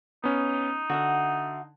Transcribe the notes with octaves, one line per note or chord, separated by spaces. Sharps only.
B3 C#4 D#4
D3 F#4 E5 F#5